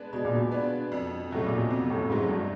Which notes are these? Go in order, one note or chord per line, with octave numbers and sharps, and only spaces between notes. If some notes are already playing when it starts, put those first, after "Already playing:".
Already playing: G#3 B3 D4
B2 G#3
A#2
B2
B3 D4
F2
A2 C#3 F#3 A3
A#2
B2
F2 C3
A2
G#2 C#3 F#3 A3
G2